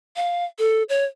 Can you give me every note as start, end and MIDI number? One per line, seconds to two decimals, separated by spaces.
0.16 0.45 77
0.59 0.83 69
0.89 1.05 73